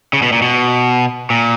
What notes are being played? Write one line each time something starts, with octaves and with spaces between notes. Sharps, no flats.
C#3
B2
A#2
B2
A#2